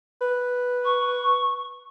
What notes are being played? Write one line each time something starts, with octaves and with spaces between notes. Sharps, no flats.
B4
C#6